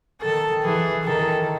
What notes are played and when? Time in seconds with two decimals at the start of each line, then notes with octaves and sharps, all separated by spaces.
0.21 D#3 A4
0.63 E3 G#4
1.04 D#3 A4